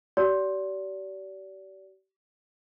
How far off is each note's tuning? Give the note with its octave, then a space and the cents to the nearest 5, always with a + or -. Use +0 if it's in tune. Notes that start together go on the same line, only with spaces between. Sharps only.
G4 -40 D5 -30